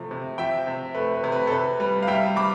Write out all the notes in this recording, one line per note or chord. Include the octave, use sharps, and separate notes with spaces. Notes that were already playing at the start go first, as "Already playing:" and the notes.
Already playing: C3 F3 A3
C3
F3 E5 G5
C3
A3 B4
B4
C3
B4
A4
C3 B4
G3 B4
F5
G3 E5 G5
G3 B5 D6